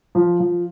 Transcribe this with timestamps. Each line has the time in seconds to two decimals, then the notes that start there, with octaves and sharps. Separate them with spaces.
0.15 F3
0.40 F3